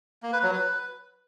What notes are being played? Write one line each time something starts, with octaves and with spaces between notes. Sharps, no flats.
A#3
B4
F#3
B4